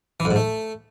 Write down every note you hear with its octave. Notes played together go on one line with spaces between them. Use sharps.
E3
F2
G#2
A3